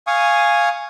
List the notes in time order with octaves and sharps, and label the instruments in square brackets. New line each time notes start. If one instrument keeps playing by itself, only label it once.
[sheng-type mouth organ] F5 G#5 C#6 D#6